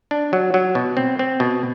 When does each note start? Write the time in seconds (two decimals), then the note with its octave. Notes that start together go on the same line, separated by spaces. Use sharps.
0.11 D4
0.33 F#3
0.54 F#3
0.75 B2
0.97 C4
1.19 C4
1.40 B2